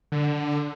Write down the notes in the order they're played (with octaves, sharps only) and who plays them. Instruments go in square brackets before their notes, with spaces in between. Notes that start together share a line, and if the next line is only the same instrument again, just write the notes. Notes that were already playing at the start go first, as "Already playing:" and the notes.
[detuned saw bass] D3